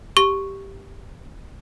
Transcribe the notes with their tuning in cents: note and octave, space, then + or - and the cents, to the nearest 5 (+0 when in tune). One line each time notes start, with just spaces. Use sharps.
G4 +0 C#6 +0